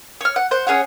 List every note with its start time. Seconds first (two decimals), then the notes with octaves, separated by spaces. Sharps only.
0.21 C#5 F6
0.36 F#5
0.51 C5 F#5
0.67 C#4 G#4 C#5 F#5